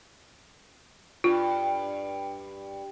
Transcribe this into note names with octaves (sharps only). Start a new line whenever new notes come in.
G2 F4